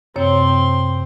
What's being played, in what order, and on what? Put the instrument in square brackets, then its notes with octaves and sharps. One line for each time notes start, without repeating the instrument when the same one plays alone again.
[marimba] F#2 C3 C#5 [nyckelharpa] C4 C6